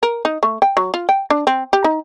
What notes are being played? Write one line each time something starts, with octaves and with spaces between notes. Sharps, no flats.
A#4
D#4
A3
G5
F#3
F4
G5
D4
C4
G4
D#4